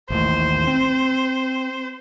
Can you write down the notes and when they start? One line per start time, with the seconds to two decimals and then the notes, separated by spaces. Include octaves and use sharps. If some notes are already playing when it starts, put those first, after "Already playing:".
0.10 A1 D#2 A2 C5
0.67 C4